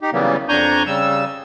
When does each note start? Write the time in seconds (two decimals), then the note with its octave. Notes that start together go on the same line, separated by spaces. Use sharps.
0.01 D#4 G4
0.13 C#3 E3 F#3 G3 A#3 B3
0.49 F2 D4 G#5 A#5 C#6 G6
0.87 C#3 G3 E6